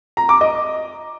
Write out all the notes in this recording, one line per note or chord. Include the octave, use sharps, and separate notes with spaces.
A#5
D6
D#5